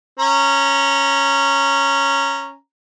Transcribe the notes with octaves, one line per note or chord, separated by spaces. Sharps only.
C#4 A#5